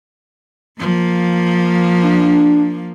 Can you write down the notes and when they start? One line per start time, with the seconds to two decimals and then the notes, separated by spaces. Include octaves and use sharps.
0.80 F3 A#3
2.03 D4